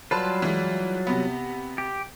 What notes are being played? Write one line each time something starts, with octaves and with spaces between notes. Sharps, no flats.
F#3 G3 F4 B4 A5 C6
E3 G#3
C3 B3
G4